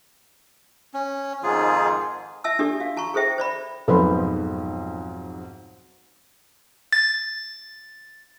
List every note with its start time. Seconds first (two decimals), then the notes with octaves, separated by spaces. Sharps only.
0.94 C#4
1.43 F2 G#2 D#3 F4 G#4
2.44 E5 A5 E6
2.59 D4 G4 A4 D5
2.80 F#4 F5
2.97 F#4 A5 A#5 C#6
3.14 G#4 A4 C5 E5 G5
3.38 C5 D5 B5
3.88 B1 F2 G#2 A4 B4 C5
6.93 A6